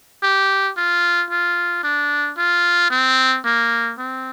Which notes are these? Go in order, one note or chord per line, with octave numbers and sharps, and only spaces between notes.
G4
F4
F4
D4
F4
C4
A#3
C4